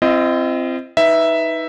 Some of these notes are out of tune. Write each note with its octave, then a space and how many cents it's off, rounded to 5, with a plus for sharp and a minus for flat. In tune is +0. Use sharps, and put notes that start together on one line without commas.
C4 +0 F4 -45 D#5 +0
D#4 +25 B4 +0 E5 +0